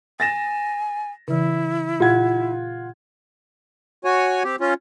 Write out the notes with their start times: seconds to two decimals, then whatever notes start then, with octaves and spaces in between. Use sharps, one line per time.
0.20 G#5 A6 A#6 E7
1.28 C#3 E3 E4
2.00 A#2 F4 F#5 G#6
4.05 F#4 C#5 G#5
4.44 C4 G4
4.60 C#4 F4